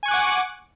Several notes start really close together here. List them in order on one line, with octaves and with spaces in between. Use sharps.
G#5 C#6 F#6 D6 F#5